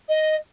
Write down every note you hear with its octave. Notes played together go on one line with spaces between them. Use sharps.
D#5